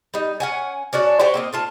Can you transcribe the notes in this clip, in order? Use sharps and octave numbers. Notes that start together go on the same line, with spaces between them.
G3 D#4
C#4 F#5 G#5
C#4 D4 F#4 D5
F#4 G4 C5 C#5
A#3 C4 D#5
A3 F4 A5